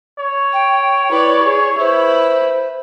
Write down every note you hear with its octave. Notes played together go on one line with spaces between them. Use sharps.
C#5
G5
E4 B4 D5
G#4
E4 B4 C5